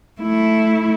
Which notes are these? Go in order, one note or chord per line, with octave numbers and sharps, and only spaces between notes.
A3 E4